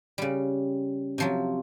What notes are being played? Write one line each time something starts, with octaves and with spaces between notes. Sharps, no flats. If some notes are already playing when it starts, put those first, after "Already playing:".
C#3 G3
C3 F3 F#3